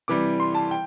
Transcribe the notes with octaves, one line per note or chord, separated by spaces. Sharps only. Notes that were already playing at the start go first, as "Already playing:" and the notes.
C3 E3 G3 D6
C6
A5
G5